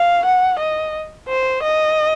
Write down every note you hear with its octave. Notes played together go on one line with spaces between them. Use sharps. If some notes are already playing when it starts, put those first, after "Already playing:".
Already playing: F5
F#5
D#5
C5
D#5